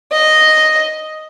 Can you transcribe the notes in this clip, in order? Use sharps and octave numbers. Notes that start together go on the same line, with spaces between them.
D#5